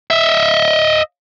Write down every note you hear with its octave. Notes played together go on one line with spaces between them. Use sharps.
D#5 E5